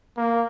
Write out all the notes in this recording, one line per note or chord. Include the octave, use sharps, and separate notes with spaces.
A#3